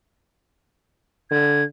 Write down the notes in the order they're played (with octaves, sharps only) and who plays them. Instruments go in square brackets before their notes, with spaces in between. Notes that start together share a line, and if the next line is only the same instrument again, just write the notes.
[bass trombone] D3 [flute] G#6